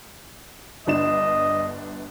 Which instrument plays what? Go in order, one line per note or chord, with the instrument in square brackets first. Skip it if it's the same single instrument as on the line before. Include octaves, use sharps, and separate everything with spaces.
[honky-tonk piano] G1 D4 E7 [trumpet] D#5